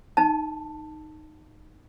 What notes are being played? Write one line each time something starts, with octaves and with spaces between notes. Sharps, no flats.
D#4 A5